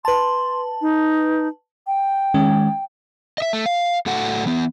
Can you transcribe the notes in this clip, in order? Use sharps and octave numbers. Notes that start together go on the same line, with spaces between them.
B4 A5 C6
D#4
G5
D#3 G#3 C#4
D#5 E5
A3
F5
A2 F#4 A4 F#5
E3 B3